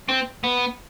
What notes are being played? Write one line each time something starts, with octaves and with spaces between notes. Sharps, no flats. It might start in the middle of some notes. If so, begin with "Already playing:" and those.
C4
B3